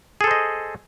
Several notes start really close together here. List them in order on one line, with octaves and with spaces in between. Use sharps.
G#4 A4 C5 D#5